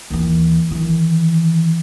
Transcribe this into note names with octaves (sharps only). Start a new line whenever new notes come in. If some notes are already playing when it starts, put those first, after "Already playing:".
D#2 E3
D#3 E3